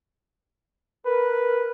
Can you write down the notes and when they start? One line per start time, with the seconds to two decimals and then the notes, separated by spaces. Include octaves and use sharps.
1.06 A#4 B4